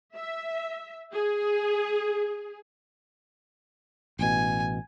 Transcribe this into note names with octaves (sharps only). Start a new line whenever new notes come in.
E5
G#4
A1 B2 G#5